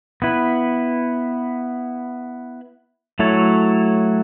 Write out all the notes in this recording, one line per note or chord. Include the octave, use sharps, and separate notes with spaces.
B3 E4 B4
F#3 A3 E4 A4 C#5